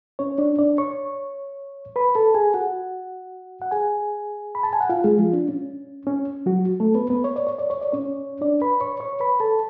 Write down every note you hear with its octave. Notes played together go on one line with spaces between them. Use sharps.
C#4 C#5
D4 D5
D4 D5
C#5 C#6
B4 B5
A4 A5
G#4 G#5
F#4 F#5
F#5
G#4 G#5
B5
A5
G#5
F#5
F4 F5
G#3 G#4
F3 F4
D4
C#4
C#4
F#3 F#4
A3 A4
B3 B4
B3 B4
C#5
D5
C#5
D5
C#5
D5
C#4 C#5
D4 D5
B4 B5
C#5 C#6
C#5 C#6
B4 B5
A4 A5